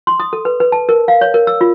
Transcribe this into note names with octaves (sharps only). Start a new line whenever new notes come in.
C6
D#6
A4
B4
B4
A5
A#4
F5
C#5
A#4
E6
F4